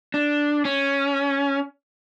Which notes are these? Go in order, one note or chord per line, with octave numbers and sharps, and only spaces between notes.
D4
C#4